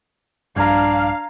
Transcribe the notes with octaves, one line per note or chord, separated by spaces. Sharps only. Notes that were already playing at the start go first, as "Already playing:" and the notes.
A#1 G2 A#2 D4 F5 A#5 G#6